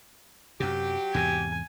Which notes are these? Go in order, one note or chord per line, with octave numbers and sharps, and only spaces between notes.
F#2 C3 F#3 G4
E2 G#2 C3 G#5